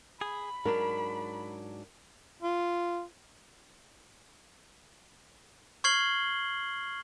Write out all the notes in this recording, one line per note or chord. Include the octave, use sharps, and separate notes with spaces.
G#4 B5
G#2 F#3 D4 A#4
F4
C#6 F6 G#6 C7 F#7 G7